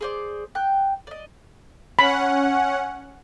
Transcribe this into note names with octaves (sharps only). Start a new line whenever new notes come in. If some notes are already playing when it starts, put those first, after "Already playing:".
G#4 C5 D5
G5 F#6
D5 D#5
C#4 F#5 B5